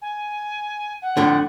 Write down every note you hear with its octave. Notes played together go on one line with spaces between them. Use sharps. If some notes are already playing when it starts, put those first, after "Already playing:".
G#5
F#5
F2 A2 D3